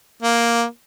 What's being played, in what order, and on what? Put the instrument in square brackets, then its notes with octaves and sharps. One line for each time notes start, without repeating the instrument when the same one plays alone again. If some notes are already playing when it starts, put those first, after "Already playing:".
[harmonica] A#3